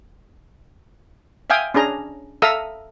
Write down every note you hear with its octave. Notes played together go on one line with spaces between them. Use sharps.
E5 F5 G5 G#5 D#6
C#4 D4 G#4 A#5
A4 E5 F5 A#5 D#6 E6